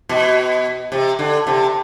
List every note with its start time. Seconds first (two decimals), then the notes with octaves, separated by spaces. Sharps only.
0.09 B2
0.92 C3
1.19 D3
1.47 C3